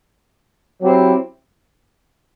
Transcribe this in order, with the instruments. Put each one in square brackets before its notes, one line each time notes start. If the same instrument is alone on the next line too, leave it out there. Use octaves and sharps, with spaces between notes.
[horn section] F#3 C4 E4 G4